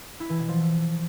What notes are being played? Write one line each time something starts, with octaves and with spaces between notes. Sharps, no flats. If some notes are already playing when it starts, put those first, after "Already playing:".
E4
E3
B2
F3